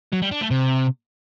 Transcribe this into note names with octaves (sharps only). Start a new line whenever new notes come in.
F#3
G3
D4
A3
C3